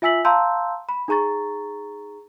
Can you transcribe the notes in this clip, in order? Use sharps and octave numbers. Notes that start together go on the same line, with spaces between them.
F4 E5 G#5 E6 B6 F#7
F5 A5 A#5 C6 E6 G6
B5
D#4 G#4 A#5 C#6 A6